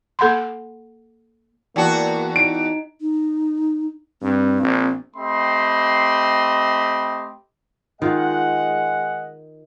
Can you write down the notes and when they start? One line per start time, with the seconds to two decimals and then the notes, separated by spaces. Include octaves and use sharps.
0.19 A#3 A4 F#5 B5 C6
1.76 E2 A#3 F#4 D5 G5 A5
2.36 D#4 D7
3.01 D#4
4.22 G2 C4
4.61 A#1
5.16 A3 C4 G4 D#5 B5 C6
8.02 D#3 G#3 F4 D#5 F#5